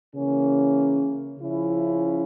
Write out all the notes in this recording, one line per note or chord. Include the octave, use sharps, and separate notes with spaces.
C#3 E3 A#3 C#4
C#3 F3 C#4 E4